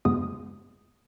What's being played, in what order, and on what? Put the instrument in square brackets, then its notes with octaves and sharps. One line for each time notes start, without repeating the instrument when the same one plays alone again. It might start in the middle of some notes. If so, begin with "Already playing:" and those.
[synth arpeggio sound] F#2 C#3 G#3 B3 D#6